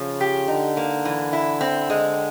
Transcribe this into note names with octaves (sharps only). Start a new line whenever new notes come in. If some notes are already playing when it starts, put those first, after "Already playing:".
Already playing: C#3 F3
G4
D3 D#4
A#3
E3
E4
C4
G#3